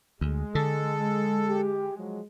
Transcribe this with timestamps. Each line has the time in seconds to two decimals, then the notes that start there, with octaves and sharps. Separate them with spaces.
0.21 D2 G#3
0.55 D3 A4
1.49 G4
1.97 F3 F#3 G#3